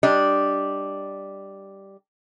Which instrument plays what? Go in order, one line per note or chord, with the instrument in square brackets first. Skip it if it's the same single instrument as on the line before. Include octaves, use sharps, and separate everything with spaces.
[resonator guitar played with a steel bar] G3 D4 D#5